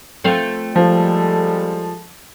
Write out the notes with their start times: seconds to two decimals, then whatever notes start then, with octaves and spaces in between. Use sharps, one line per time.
0.24 A3 C4 F4
0.76 F3 G3 G#3 A4